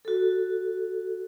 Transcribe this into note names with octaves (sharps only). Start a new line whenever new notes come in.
F#4 A4